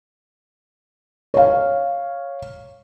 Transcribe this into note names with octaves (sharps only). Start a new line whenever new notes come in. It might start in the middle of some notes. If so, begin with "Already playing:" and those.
C#5 F5